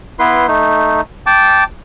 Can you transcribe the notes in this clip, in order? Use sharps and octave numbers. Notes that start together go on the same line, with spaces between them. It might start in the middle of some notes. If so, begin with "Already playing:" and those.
B3 E4 B4 C6
A3 D#4
G5 A5 D6